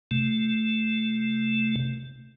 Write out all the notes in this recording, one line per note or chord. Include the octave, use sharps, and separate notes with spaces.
C3 A3